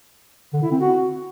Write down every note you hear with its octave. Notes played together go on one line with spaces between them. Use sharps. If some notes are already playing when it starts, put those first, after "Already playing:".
D3
E4
C4
F#4